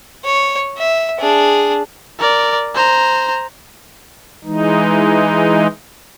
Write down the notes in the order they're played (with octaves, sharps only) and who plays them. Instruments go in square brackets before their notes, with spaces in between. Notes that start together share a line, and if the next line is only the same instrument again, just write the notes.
[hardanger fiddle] C#5
E5
D4 G#4
[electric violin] A#4 D5
C5 A#5
[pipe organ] E3 G#3 D#4